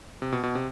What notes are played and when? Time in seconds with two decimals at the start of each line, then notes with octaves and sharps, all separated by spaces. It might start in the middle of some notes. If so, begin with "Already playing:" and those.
0.22 C3
0.32 B2
0.43 B2
0.55 C3